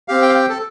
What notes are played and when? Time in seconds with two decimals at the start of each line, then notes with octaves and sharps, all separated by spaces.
0.08 C4 G4 F5
0.22 G5
0.29 F5
0.35 G5
0.49 A4